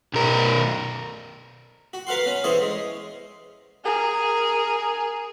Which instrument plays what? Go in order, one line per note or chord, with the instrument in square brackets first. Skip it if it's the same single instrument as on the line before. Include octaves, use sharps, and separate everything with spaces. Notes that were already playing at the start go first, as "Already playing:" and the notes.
[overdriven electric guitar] B1 A#4
[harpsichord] F#4
A#4 B4 F5 F#5 C6
C#4 B5
E3 G#4 C5 C#5 D#5
G#3
[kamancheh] G#4 A#4